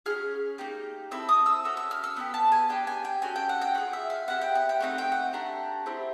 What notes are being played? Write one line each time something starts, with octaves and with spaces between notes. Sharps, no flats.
C#4 F4 G#4 F6
A#3 D#4 G4
C4 E4 A4 E6
D#6
E6
C#4 F#4 A4 E6
E6
F6
E6
B3 D4 G4
A5
G#5
D4 G4 G5
G#5
G5
C#4 F#4 A4 G#5
G5
F#5
G5
C#4 F4 G#4 F#5
E5
F5
C4 E4 G4 F#5
G5
F#5
G5
A3 C4 D#4 F#5
G5
F#5
A3 D4 G4 A#5
C4 E4 G4